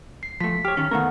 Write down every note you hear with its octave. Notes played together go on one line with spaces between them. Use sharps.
C7
F3 A3 B6
G4 C#5 F6
D#3 C#4
D#3 A3 B3 A#4 F#5